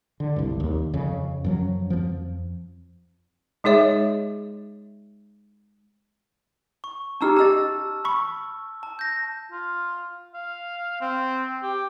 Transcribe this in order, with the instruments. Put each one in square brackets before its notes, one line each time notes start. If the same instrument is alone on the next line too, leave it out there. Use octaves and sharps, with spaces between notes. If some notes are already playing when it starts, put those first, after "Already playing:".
[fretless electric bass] D3
C2 G2
D#2
F2 C#3
F#2 F3 F#3
F2 F3
[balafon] G#3 D#4 G#4 C#5 E5
[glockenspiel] C#6
[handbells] C#4 D#4 G4 [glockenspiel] A5 E6 F6
[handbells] G4 D#5 [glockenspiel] A5 E6 A6
[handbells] B5 C#6
[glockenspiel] A5
G6 A#6
[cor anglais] F4
F5
C4
G4